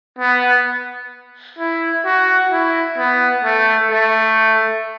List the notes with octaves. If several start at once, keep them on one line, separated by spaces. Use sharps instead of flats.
B3
E4
F#4
E4
B3
A3
A3